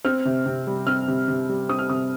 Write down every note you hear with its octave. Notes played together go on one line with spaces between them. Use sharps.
C4 F6
C3
C3
G3
C4 F6
C3
C3
G3
C4 D#6
F6
C3 D#6